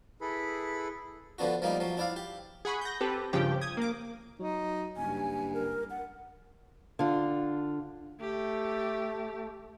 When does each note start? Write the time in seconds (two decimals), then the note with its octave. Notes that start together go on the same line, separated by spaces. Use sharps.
0.21 E4 G#4 A4 B4 B5
1.38 D3 F3 B3 D4 F#4
1.62 F3 G3 A#3 D#4
1.80 F3 F#3
1.97 D4 E4 D5 F5
2.16 G4
2.65 G#4 F#5 B5 C#6
2.81 G6 A#6
3.01 C4 G4 A4 B4
3.33 G2 C#3 F3 G4 G5
3.61 D#6 G#6
3.77 A#3 D6
4.39 F#3 D#4
4.97 F#1 G2 G#5
5.54 A#4
5.90 F#5
6.99 D3 F4
8.20 A3 G4